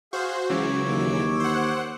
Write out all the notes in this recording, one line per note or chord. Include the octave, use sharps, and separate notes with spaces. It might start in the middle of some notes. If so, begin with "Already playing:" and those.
F#4 G#4 C5 F5 G6
C#2 C#3 E3 F#3 C#5 D6 E6
D#2
C5 F#5